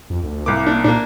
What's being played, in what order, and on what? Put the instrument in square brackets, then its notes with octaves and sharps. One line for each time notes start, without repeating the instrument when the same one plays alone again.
[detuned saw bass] F2
D2
[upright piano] C2 D6 [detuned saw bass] A#3
[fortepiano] D4
[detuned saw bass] A#2 [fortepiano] A#3 D4